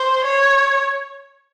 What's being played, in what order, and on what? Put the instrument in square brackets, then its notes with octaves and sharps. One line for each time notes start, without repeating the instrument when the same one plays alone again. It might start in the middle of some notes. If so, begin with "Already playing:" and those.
Already playing: [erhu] C5
C#5